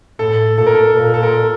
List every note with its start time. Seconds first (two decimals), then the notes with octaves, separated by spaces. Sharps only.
0.19 A2 A4
0.58 A#2 A4
0.66 A#4
0.74 A4
0.97 A#2 A#4
1.14 A4
1.23 A#4